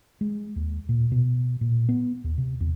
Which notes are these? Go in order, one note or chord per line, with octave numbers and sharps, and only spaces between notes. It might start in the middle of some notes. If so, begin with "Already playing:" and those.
G#3
D#2
A#2
B2
A#2
B3
D#2
C3
E2